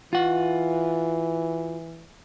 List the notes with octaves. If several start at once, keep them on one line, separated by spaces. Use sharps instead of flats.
E3 F4 F#5